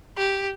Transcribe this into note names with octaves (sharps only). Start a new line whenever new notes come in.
G4